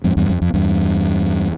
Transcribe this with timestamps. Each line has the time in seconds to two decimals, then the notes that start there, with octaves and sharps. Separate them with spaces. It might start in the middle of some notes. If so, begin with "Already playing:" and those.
0.04 F2 G#2
0.17 E2 G2
0.30 F2
0.42 F2
0.54 E2 G2